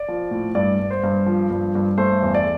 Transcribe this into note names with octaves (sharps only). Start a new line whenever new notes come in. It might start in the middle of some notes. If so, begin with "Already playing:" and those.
Already playing: D5
F3
A2
G2 D5
G2
C5
G2
F3
G2
G2
A3 C5
E2
D5